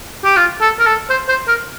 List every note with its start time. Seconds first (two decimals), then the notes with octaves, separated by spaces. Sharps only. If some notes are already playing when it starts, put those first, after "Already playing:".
0.25 G4
0.37 F4
0.61 A4
0.79 A#4
0.86 A4
1.10 C5
1.29 C5
1.48 A#4